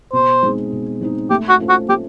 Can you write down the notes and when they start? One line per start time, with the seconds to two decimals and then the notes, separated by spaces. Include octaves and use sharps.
0.13 B2 C5
0.43 G#3 C4 D#4
0.72 B2
1.01 G#3 C4 D#4
1.30 A3 G4
1.49 F#4
1.59 C#4 F4 A4 C5
1.69 F#4
1.89 A3 G4